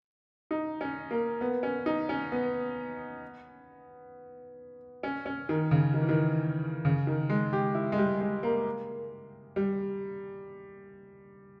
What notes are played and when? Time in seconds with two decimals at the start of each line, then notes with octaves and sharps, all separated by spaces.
0.51 D#4
0.81 C#4
1.11 A#3
1.41 B3
1.63 C#4
1.86 D#4
2.09 C#4
2.32 B3
5.03 C#4
5.26 C#4
5.49 D#3
5.71 C#3
5.94 D#3
6.02 E3
6.09 D#3
6.85 C#3
7.07 D#3
7.29 G#3
7.53 G4
7.75 E4
7.92 G#3
7.98 G3
8.21 G#3
8.43 A#3
9.56 G3